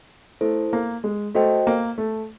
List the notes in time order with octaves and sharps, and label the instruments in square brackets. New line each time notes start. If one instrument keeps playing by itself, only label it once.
[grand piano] A3 [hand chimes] E4 A4 C5
[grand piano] A#3
G#3
[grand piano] A3 [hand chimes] F#4 A4 C5 D#5 G5
[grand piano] A#3
A3